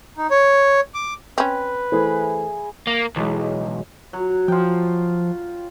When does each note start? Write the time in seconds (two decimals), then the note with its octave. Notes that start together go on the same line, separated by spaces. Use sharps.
0.17 D#4
0.31 C#5
0.94 D6
1.38 C4 C#4 B4
1.92 E3 A3 E4 G#4 C5
2.87 A#3
3.16 B1 E3 F#3 G#3
3.66 F#3
4.13 F#3
4.48 F3 F4 G5